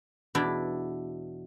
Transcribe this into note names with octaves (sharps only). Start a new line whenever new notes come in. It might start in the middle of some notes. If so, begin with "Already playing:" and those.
E2 B2 D4 E4 G5